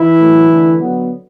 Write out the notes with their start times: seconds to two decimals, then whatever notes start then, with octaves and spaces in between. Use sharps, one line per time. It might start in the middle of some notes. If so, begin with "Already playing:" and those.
Already playing: E3 E4
0.20 A2 F#3 A3
0.49 D3 A3
0.80 D3 F#3 B3